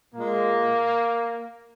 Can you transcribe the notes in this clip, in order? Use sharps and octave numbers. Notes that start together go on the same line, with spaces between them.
A#2 G#3 A#3